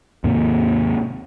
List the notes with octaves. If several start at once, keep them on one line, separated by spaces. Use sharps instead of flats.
D#2 G#2 C3 A#3